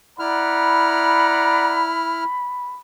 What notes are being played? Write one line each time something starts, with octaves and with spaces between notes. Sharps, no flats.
E4 D5 F#5 A#5 B5 F6